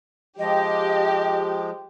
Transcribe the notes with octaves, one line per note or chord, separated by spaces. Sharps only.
F3 G#3 G4 D#5